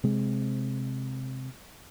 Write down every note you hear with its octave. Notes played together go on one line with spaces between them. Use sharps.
C3 G#3 C4